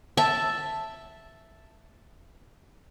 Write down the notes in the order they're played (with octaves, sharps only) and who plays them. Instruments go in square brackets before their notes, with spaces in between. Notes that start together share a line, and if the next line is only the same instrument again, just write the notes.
[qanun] E5 A5